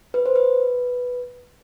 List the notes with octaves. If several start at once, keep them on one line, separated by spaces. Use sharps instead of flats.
B4
C5
B4